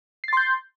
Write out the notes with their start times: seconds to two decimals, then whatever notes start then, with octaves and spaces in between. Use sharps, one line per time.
0.24 C7
0.28 A6
0.33 C6
0.37 G6